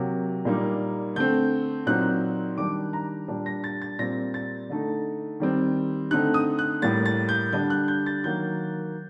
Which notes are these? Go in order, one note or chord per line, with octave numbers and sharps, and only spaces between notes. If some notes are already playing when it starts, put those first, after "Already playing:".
Already playing: C3 F#3 A#3
A#2 G3 A#3 D#4
D3 A3 C4 G6
A#2 F#3 C4 D#4 F#6
D#3 G3 D4 D6
A#5
A#2 G3 D4
A#6
A6
A6
A#2 G3 C4 A#6
A6
D3 A3 D#4
D#3 G3 C4
D3 A3 C4 D#4 F#6
D#6
F#6
A2 G3 A#3 A6
A6
G6
D3 G3 D4 G6
F#6
G6
A6
D#3 F#3 A#3 G6